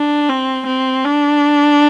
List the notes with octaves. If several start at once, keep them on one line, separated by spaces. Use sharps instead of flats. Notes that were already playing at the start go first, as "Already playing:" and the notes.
Already playing: D4
C4
C4
D4